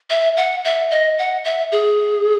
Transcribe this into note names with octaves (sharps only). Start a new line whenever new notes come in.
E5
F#5
E5
D#5
F#5
E5
G#4